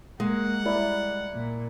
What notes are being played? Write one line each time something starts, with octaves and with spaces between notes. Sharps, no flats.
G#3 A#3 F#5
G3 E4 D5 A#5
A#2